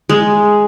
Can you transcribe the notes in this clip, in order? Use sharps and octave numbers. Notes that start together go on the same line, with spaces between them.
G#3